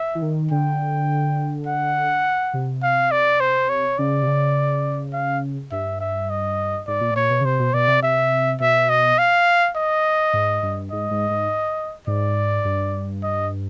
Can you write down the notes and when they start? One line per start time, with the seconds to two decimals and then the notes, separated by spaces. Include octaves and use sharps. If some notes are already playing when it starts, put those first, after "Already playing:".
Already playing: E5
0.15 E3
0.22 D#3
0.51 D3 G5
1.67 F#5
2.54 C3
2.82 F5
3.11 D5
3.40 C5
3.69 C#5
3.98 C#3 D5
4.22 C3
4.27 C#3
5.13 F5
5.71 G2 E5
6.00 E5
6.30 D#5
6.87 G#2 D5
7.01 A#2
7.11 A2
7.16 A#2 C#5
7.30 B2
7.41 C#3
7.45 C3 C5
7.59 B2
7.74 B2 D5
7.88 C3
8.03 C3 E5
8.60 B2 E5
8.89 D#5
9.18 F5
9.77 D#5
10.33 G#2
10.63 G2
10.91 G#2 D#5
11.11 G#2
11.30 G#2
12.07 G#2 D5
12.65 G2
13.23 D#5